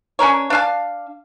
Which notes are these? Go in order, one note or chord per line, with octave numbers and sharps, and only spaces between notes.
C#4 D4 A#4 C#5
D4 F5 A5